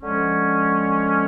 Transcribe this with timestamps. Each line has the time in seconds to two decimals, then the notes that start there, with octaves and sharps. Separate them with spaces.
0.01 D3 F3 G#3 C#4